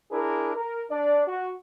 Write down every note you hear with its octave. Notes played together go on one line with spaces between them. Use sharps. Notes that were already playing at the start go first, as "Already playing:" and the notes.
D4 E4 G#4 A#4
A#4
D4 D5
F#4